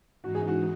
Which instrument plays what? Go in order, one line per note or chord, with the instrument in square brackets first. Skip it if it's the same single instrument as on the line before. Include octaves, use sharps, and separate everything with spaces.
[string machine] G#2 E3 G#3 D#4 [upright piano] F#4
[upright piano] G#4
F#4